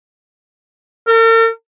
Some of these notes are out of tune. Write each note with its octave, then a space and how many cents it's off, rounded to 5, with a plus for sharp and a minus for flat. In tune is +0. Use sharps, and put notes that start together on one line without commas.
A#4 -45